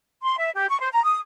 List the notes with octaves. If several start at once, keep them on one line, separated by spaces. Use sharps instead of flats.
C6
E5
G4
C#6
C5
A#5
D#6